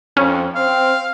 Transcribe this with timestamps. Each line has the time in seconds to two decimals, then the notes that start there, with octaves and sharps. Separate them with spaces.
0.17 F2 C#4
0.55 C4 F5